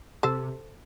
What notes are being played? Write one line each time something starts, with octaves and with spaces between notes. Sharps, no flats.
C3 A4 C5